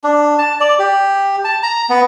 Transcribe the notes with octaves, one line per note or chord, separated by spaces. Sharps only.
D4
A5
D5
G4
A5
A#5
B3